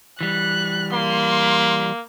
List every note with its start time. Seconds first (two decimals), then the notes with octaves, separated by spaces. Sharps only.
0.21 E3 G3 F#6
0.93 A#3 C6